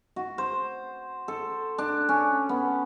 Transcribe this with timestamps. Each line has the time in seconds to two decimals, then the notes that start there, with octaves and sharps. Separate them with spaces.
0.16 F#4
0.38 C5
1.28 A4
1.78 D4
2.09 C#4
2.49 B3